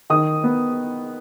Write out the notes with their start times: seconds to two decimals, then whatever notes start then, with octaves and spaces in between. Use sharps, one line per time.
0.10 D#3 D#6
0.44 B3